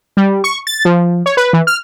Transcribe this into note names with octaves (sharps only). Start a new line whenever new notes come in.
G3
C#6
A6
F3
C#5
B4
E3
F6